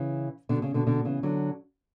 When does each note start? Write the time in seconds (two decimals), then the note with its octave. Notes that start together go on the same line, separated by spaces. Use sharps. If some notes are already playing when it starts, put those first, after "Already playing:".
Already playing: C#3 E3
0.49 B2 D3
0.62 C#3
0.74 B2 D3
0.87 B2 D3
1.05 C#3 E3
1.23 D3 F#3